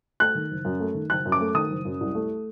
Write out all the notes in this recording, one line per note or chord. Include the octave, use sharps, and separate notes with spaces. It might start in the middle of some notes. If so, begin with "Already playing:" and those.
A3 F#6
D#3
F#1
F#2
A3
D#3
F#1 F#6
F#2
D6
A3
D#3 D#6
F#1
F#2
C2
A3